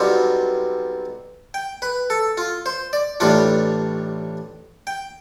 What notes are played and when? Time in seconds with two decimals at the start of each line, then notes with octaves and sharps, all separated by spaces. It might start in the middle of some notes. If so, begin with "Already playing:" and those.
Already playing: B1 B2 G3 C4 F4
1.54 G5
1.82 B4
2.10 A4
2.37 F4
2.66 C5
2.93 D5
3.20 A1 A2 G3 D4 F4 D5
4.87 G5